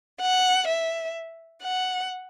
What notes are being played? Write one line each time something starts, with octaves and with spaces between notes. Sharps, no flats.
F#5
E5
F#5